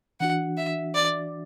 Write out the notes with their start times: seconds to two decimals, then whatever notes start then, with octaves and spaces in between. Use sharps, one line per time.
0.20 E3 D4 F#4 F#5
0.57 E5
0.95 D5